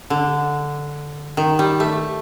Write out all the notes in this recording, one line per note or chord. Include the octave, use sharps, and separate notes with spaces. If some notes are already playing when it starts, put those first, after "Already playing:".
D3
D#3
G3
A3